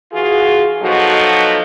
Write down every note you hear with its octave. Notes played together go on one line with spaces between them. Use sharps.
E3 F4 F#4 G#4
B2 F3 F#3 D#4 F#4 A4